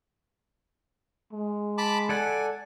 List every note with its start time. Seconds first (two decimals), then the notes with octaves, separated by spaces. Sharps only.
1.33 G#3
1.78 A5 B5 D6
2.09 A4 D5 F#5 G#5